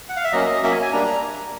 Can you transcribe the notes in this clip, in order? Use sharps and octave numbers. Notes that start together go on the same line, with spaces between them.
F#5
F5
E5
F#3 A#3 C#4 D#5
F#3 A#3 C#4 E5
G#5
G#5
G3 A#3 D4 A#5